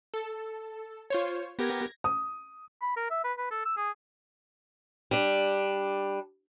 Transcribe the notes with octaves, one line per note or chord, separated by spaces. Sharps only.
A4
F4 C5 C#5
B3 G4 A#4 G#6 A#6
D#6
B5
A#4
E5
B4
B4
A4
E6
G#4
G3 D4